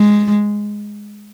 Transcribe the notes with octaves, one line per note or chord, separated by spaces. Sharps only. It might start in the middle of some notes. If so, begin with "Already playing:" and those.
Already playing: G#3